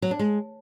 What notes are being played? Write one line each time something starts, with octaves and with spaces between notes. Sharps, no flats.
F#3
D4
G#3